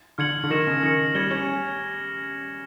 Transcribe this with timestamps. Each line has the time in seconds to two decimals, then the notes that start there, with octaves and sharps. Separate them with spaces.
0.18 D3 F6 G#6 C#7 F#7
0.44 D3
0.50 D#3 F6 A#6 C#7 E7
0.67 C#3
0.83 D#3 F6 A#6 C#7
1.15 G3 G#6 C#7 E7 G7
1.31 C#4